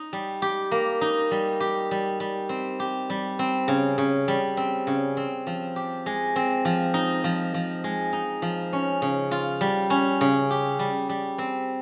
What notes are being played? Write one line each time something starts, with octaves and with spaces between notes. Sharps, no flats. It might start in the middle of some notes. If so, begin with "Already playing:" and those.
Already playing: D#4
G3
G4
A#3
D#4
G3
G4
G3
G3
C4
G4
G3
C4
C#3
C#3
G3
C4
C#3
C4
F3
G4
G#3
C4
F3
D#4
F3
F3
G#3
D#4
F3
C#4
C#3
F4
G3
C#4
C#3
G4
G3
G3
C4